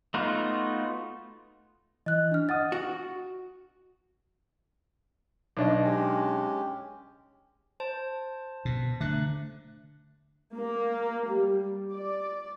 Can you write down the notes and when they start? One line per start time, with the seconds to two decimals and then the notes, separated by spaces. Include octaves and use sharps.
0.14 A3 B3 D#4 F4 F#4
2.06 E3 D#5 F#6
2.32 D4 F6
2.49 D#5 F#5 D#6 A6
2.72 F#4
5.57 B1 D4 D#5
5.84 G#3 C#4 G4
7.80 C5 A5
8.65 B2
9.01 D3 A3 F#6
10.54 A#3
11.28 G3
11.92 D5